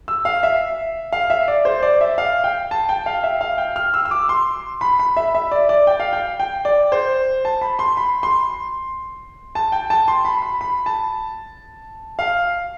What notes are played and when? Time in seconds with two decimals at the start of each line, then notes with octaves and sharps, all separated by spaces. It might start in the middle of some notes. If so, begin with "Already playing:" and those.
0.08 E6
0.25 F5
0.43 E5
1.13 F5
1.30 E5
1.48 D5
1.65 C5
1.83 D5
2.01 E5
2.18 F5
2.44 G5
2.71 A5
2.89 G5
3.06 F5
3.23 E5
3.41 F5
3.58 G5
3.76 F6
3.94 E6
4.05 E6
4.11 D6
4.29 C6
4.81 B5
4.99 B5
5.17 E5
5.35 E5
5.51 D5
5.69 D5
5.87 G5
6.00 F5
6.13 G5
6.40 G5
6.65 D5
6.92 C5
7.45 A5
7.61 B5
7.79 C6
7.97 B5
8.23 C6
9.55 A5
9.72 G5
9.90 A5
10.08 C6
10.25 B5
10.42 B5
10.61 B5
10.86 A5
12.19 F5